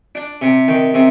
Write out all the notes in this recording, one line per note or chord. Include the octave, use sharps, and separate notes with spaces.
D4
C3
D#3
C3